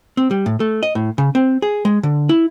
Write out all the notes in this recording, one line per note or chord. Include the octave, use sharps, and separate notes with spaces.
C4
G3
A2
A3
D#5
A2
C#3
C4
G#4
G#3
D3
E4